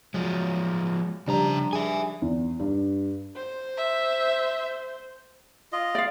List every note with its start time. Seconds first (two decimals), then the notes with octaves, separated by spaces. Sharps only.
0.14 F3 F#3 G#3
1.28 C#3 F3 G3 D4 A#5
1.73 G#4 E5 G#5
2.22 E2
2.60 G2
3.36 C5
3.77 E5
5.72 F4 D#5
5.95 D5 F5